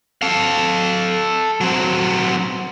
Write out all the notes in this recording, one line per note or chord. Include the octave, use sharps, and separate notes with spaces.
A4 F5
F#3 C4